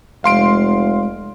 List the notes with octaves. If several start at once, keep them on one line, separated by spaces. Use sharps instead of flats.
F1 G#3 F5 C6 D7